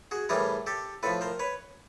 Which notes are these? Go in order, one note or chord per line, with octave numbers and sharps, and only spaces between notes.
F#4 G#4
A2 E3 G3 G#4 A#4
G4 A4
A2 F3 A4 B4
A#4 C5
B4 C#5